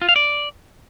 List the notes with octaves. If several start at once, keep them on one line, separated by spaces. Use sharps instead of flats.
F4
F5
D5